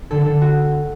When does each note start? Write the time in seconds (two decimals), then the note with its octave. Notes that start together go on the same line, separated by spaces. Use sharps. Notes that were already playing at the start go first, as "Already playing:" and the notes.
0.11 D3 A4
0.21 D3 A4
0.41 F#4